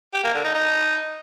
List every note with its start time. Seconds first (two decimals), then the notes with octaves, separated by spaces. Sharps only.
0.14 G4
0.24 A#3
0.34 D3
0.44 D#4
0.55 D#4